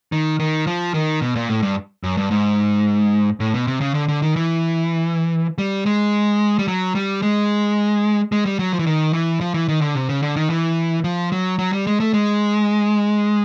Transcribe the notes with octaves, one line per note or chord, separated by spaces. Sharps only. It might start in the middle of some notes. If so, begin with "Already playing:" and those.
D#3
D#3
F3
D#3
B2
A#2
A2
G2
F#2
G2
G#2
A2
B2
C3
C#3
D3
D3
D#3
E3
G3
G#3
G3
F#3
G3
G#3
G#3
G3
F#3
F3
E3
D#3
E3
F3
E3
D#3
D3
C3
C#3
D3
D#3
E3
F3
F#3
F#3
G3
G#3
A3
G#3